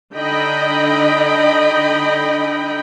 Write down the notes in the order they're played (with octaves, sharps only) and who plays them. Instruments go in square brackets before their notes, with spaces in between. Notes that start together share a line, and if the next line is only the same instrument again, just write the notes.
[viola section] D3 D#4 D#5 G5 B5